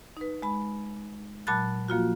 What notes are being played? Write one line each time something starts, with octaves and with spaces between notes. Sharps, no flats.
D#4 B4
G#3 B5
A#2 F#3 A5 B5 F#6 A6
F3 A#3 F4 F#4